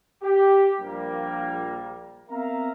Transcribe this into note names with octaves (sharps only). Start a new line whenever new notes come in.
G4
A#1 G3 A#3
B3 C4 A#4 E5 F5 A#5